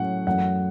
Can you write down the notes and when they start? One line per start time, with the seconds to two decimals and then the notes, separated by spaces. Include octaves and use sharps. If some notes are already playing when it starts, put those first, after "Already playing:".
Already playing: A2 F#3 C#4 F#5
0.27 F#2 E3 A3 E4 F#5